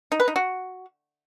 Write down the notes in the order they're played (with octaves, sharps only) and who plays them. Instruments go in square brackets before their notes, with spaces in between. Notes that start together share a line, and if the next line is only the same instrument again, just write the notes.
[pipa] D#4
B4
D#4
F#4